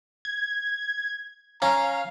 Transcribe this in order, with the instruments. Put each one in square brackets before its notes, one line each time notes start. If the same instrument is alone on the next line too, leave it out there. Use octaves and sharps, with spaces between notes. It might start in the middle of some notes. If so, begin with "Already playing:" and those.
[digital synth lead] G#6
[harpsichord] C#4 [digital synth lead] F5 [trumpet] A#5